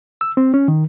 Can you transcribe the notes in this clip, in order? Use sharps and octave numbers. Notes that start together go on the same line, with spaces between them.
E6
C4
C#4
D#3